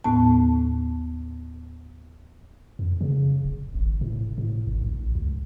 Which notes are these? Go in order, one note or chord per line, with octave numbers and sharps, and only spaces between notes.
D#2 A2 B3 A5
F2
C#3
D1
G#1
A2
A2
G#1
A#1
C#2